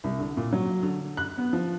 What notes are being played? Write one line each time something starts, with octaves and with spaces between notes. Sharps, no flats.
C2
D3
A#2
F#3
D3
F#6
B3
F3